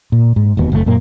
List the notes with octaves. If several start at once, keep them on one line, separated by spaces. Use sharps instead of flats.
A#2
G#2
E1 D#2 B2 B3
F#1 B2 A3
F#2 A#2 A#3